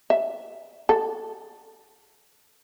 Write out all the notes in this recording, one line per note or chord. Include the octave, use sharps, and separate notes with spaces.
E5
A4